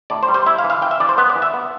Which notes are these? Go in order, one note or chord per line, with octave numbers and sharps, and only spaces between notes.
A2 D5
C5
G3
C5
E4 E5
F5
E3
F5
E3 G5
E5
E3 D5
C5
B3 B4
D5
E3
E5
B3